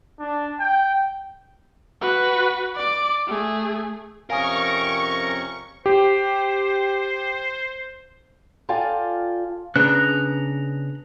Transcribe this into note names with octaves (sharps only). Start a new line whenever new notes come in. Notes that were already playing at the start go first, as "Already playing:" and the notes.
D4
G5
F#4 B4
D5 D6
A3 G#4
F2 C3 C#4 A#4 F5 G#5 C#6 D#6
G4 C5
F4 A4 D5 F5 G5 G#5
C#3 B3 D4 A#5 F#6